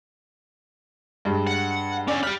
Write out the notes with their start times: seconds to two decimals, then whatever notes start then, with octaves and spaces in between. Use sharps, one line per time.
1.25 G2 G#3
1.47 F#5
2.08 D3 C#4 D5
2.23 G4 B5 F6